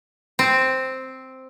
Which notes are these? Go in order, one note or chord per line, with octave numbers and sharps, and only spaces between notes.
C4